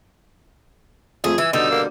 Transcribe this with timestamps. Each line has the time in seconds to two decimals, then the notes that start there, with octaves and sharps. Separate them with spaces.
1.24 F2 A3 G#4
1.38 E3 G#5 E6
1.53 B2 D3 G3 D#4 E6
1.71 A#3